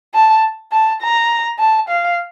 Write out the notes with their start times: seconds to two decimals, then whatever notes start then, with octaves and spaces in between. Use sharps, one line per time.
0.14 A5
0.72 A5
1.01 A#5
1.59 A5
1.89 F5